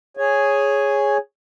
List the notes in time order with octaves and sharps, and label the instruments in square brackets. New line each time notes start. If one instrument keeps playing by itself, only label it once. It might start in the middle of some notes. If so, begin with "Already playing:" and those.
[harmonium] G#4 C#5 G#5